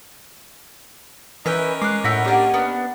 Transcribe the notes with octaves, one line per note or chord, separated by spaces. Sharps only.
E3 C#4 D#4 A#4 B4 E5 G5
G#3 D6 F#6 C7
A2 E4 F#5 G5 A#6 B6
A#3 D4 G4 D5 F#5 A#5
B3 D4